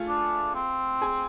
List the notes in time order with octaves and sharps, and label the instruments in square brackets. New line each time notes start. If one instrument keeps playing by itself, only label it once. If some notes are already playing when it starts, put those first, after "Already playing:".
Already playing: [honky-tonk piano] A3 F4 G#4
[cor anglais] D4
C4
[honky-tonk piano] G#4